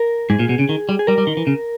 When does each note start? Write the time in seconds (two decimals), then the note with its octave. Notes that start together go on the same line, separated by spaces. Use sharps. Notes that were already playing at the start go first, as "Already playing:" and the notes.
Already playing: A#4
0.30 G#2 G#4
0.39 A#2
0.49 B2
0.59 C#3
0.69 D#3
0.89 G3
0.99 G#4
1.07 G3 A#4
1.18 G3
1.27 D#3
1.37 E3
1.47 C#3